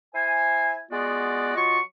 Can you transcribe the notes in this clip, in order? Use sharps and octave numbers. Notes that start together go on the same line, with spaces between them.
E4 C5 G#5
G#3 B3 F4 F#4 D5
F#3 F4 D#5 C#6